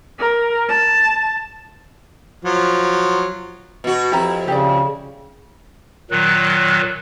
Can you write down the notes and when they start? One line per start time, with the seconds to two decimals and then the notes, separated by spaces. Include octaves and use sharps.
0.19 A#4
0.69 A5
2.45 F3 F#3
3.84 B2 F#4
4.12 F2 E4 G4 A#5
4.48 C#3 G4 G#4 D5
6.11 A#2 D#3 F#3 F#6